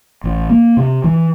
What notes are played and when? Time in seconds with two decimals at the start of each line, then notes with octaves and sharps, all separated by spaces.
0.24 A1
0.50 A#3
0.77 C3
1.04 E3